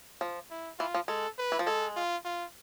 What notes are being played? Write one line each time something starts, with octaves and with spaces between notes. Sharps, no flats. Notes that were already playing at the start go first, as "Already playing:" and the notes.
F3
E4
E3 F4
F3
G#3 A4
B4
E3
F3
G#3 A4
F4
F4